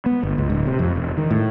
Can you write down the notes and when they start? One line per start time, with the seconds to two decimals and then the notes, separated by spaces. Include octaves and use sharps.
0.06 B3
0.23 G1
0.38 C#2
0.50 D1
0.67 C3
0.79 F2
0.95 E1
1.17 D#3
1.31 A2